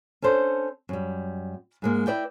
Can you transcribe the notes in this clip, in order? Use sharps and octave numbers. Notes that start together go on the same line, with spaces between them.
C#4 D4 A4 C5
F#2 G3
G#2 G#3 A#3
E4 B4 D5 D#5 G5